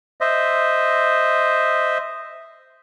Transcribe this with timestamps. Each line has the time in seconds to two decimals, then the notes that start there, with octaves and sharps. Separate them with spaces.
0.21 C5 D#5 E5